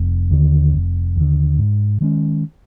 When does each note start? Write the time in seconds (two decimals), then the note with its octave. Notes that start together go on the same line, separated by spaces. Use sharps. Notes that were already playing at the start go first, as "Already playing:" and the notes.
Already playing: F1
0.31 D#2 D3
0.74 F1
1.16 D#2 D3
1.59 G#2
2.01 D#3 G#3 C#4